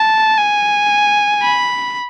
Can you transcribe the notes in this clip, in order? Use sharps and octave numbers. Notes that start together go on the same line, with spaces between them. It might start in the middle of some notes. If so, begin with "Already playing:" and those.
Already playing: A5
G#5
B5